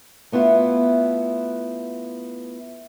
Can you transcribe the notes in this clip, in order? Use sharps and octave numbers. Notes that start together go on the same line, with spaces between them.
A3 B3 E4 F4